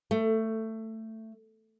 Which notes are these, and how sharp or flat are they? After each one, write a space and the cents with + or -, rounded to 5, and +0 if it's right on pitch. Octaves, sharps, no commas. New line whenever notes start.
A3 +15